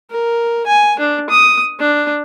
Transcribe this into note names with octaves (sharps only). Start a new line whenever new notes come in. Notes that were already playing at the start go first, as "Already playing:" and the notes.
A#4
G#5
D4
D#6
D4